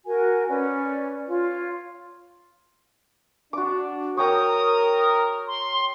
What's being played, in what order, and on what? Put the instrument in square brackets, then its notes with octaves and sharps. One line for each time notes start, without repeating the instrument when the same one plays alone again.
[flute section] F#4 A#4 G#5
C#4 B4 D5
F4 C#5
[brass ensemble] D4 [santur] F#4 D6
[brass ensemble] A#4 [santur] C#5 G5 A#5 [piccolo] D#6
[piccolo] C6